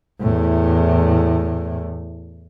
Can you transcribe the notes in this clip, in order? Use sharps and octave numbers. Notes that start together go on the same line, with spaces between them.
E2 A2